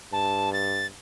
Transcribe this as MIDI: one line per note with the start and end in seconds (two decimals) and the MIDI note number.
0.13 0.91 43
0.13 0.52 81
0.53 0.86 93